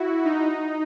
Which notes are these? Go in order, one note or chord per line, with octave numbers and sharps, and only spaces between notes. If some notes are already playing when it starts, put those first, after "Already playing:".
Already playing: E4 F#4
D#4